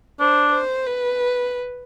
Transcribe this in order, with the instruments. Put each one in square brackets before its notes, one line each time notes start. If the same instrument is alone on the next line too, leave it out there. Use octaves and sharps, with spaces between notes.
[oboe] D4 [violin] C5
[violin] C5
B4